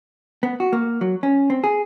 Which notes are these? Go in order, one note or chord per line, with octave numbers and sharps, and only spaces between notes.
B3
F#4
A#3
F#3
C#4
C4
G#4